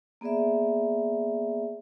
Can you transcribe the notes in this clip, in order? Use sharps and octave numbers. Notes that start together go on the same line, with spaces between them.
A#3 B3 G#4 D5 E5